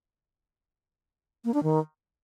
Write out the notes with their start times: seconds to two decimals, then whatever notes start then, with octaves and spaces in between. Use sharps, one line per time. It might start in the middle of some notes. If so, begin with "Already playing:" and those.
1.45 A#3
1.54 D4
1.63 D#3